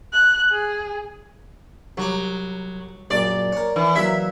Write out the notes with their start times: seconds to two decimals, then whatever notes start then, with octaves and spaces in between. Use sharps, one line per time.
0.13 F#6
0.52 G#4
1.97 C2 F#3 A#5 D6
3.10 A#1 F#2 D5
3.53 C#4 A#4
3.76 E3
3.95 E3 F#3 A#3 E5